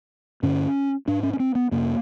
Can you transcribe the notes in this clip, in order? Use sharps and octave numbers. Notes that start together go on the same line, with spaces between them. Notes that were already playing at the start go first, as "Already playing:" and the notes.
G2 D3 C#4
G#2 D4
C#4
C#4
C4
B3
F2 C3 A#3